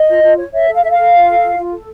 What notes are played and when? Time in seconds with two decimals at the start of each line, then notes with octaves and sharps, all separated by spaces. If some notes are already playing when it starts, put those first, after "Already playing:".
Already playing: D#5
0.08 F4
0.23 F4
0.38 C#5
0.53 C#5 E5
0.69 A4
0.75 F5
0.83 A4 E5
0.90 F5
0.97 A4
1.13 F4
1.28 A4
1.42 F4
1.57 F4
1.73 A4